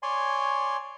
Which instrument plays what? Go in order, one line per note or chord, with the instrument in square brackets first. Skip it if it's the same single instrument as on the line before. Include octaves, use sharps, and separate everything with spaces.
[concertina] C#5 D5 G#5 C6